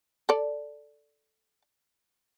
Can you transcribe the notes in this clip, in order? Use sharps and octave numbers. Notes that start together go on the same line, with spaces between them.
A4 D5